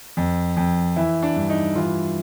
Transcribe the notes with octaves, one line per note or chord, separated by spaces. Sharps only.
F2
F2
E3 E4
D4
G2
D#4
E3 F4